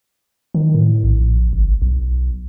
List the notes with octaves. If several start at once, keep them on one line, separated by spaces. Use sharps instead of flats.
D#3
A2
A#1
G1
B1